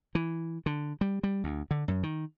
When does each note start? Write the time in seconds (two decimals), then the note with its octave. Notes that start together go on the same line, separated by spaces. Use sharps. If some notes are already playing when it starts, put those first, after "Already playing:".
0.15 E3
0.66 D3
1.01 G3
1.23 G3
1.44 D2
1.71 D3
1.88 F#2
2.03 D#3